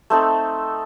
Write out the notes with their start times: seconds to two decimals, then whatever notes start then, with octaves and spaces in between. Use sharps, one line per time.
0.10 A3 C4 D#4 A4